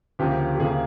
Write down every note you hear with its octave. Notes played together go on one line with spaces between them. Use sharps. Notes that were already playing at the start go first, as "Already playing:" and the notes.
D2 C#3 F3 A#3 G4
G4
D2 C#3 F3 A#3 G#4